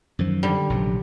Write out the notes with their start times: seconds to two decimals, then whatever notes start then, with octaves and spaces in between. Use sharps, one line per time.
0.19 F#2 D#3 F3
0.43 D3 G3
0.70 A#1 C3 F#3